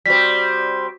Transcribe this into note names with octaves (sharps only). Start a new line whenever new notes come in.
G3 C4 F#4 B6